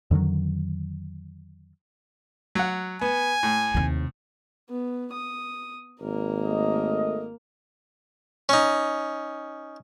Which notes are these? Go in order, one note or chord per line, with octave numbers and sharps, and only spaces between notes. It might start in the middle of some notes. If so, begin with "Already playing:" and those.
F2 D3 D#3 F#3
F#3 F#5
B3 G#5
A2
D#2 C3
B3
D#6
G#1 A#3 A#4
A3 D#5
C#4 D#4